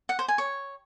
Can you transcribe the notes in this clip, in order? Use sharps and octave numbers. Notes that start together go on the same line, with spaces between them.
F#5
C5
G#5
C#5